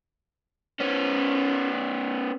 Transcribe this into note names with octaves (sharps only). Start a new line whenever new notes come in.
B3 C#4